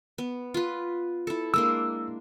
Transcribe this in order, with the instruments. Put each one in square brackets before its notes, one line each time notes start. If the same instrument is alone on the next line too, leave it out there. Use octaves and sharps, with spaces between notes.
[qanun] B3
F4 B4
E4 A4
[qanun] G#3 A#3 D4 [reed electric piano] E6